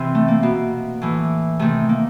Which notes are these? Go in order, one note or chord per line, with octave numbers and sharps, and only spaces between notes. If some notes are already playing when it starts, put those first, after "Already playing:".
Already playing: C3 E3 C4
A3
A#3
B2
A2 E3
C3 D#3 A3
A#3